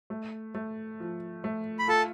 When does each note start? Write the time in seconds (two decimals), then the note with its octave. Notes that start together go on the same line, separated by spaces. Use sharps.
0.10 A3
0.55 A3
1.00 F3
1.44 A3
1.79 B5
1.88 F4 A4 A5